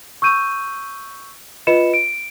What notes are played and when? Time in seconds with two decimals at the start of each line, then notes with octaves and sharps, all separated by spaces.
0.22 C#6 E6 G6 D#7
1.67 F4 B4 D#5 B5 C#7 E7
1.94 D7